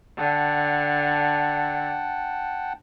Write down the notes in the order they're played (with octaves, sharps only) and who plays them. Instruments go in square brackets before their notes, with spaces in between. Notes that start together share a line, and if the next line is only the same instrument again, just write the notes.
[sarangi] D3 [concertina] F#5 G5 A5